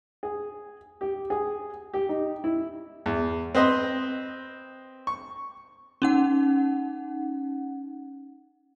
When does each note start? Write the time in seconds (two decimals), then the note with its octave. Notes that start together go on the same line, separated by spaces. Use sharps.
0.23 G#4
1.01 G4
1.30 G#4
1.94 G4
2.09 D#4
2.44 E4
3.06 E2
3.55 C4 B4 D#5 C6
5.07 C#6
6.02 C#4 D#4 F#5